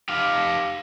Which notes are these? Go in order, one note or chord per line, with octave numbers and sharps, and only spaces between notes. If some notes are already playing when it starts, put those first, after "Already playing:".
G4 F5